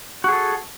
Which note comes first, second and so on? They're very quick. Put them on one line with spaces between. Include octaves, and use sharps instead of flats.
F#4 G#4 A4